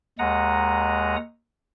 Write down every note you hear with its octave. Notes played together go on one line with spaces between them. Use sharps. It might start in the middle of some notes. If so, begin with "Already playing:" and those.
D#2 G#3 F#5 A#5 D#6